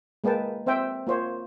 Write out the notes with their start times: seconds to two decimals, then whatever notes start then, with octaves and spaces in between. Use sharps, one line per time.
0.24 G#3 A#3 B4 G5 A5
0.66 C4 C5 E5 G5
1.07 A#3 F4 C5 C#5